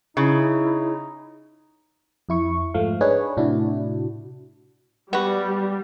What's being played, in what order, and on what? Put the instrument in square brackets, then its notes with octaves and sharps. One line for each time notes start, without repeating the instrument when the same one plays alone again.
[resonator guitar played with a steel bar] C#3 [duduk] D#4 [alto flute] E4
[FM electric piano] F2 E4 C#6
G#2 F3 A3 F5
D4 D#4 G#4 B4 C#5
A2 C3 D4 E4 F#4
[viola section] G3 [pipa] B3 F#4